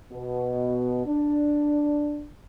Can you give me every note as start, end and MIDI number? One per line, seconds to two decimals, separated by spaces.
0.11 1.04 47
1.05 2.25 62